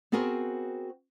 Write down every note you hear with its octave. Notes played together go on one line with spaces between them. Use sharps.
B3 C4 F#4 G#4 A#4 C5